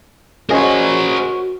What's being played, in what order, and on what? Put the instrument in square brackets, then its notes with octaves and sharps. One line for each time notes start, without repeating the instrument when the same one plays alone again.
[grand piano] C#4 G#4 D#5 [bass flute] F#4 [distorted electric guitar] A#4 C5